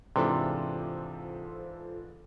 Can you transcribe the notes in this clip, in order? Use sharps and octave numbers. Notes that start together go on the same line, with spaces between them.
G#2 C3 E3 D4 F4 A4 C5